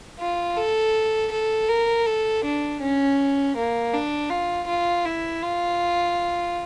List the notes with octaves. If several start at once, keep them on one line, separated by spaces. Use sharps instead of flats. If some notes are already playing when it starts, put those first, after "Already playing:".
F4
A4
A4
A#4
A4
D4
C#4
A#3
D4
F4
F4
E4
F4